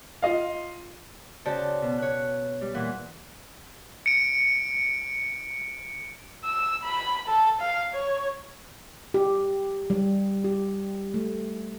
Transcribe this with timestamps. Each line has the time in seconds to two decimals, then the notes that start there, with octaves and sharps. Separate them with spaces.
0.22 F4 D#5 F5
1.45 C#3 F#4 C5 D5 G5 A5
1.82 B2
1.98 C#5 F#6
2.61 G3
2.74 A#2 E3 F#5
4.06 C#7 D7
6.45 E6
6.84 B5
7.29 A4
7.61 F5
7.94 C#5
9.14 G4
9.90 G3
10.44 G4
11.14 A3